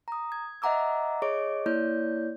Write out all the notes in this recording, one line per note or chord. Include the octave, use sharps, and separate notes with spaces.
A#5 D#6
G#6
D#5 E5 F#5 A#5 D6 E6
G#4 C#5 D#5 C#6 D6 D7
A#3 E4 C#5 D5 G6